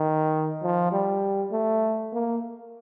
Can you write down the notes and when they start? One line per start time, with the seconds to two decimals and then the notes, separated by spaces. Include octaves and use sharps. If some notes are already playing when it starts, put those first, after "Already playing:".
Already playing: D#3
0.63 F3
0.92 G3
1.52 A3
2.13 A#3